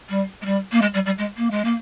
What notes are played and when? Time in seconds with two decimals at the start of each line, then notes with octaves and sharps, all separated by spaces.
0.09 G3
0.42 G#3
0.46 G3
0.72 A#3
0.81 G#3
0.94 G3
1.06 G3
1.18 G#3
1.37 A#3
1.51 G#3
1.64 A#3